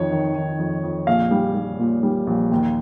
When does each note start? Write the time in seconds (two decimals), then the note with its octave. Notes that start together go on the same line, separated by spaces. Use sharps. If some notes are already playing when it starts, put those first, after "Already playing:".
Already playing: F2 D#3 C#5
0.12 D#3
0.35 D#3
0.58 F2
0.83 F2
1.07 A#1 F5
1.31 G3
1.55 G3
1.79 A#2
2.03 G3
2.27 A#1
2.52 D#2